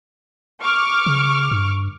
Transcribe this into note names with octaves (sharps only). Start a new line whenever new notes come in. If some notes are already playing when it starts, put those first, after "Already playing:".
C#6 D6 F6
C#3
G2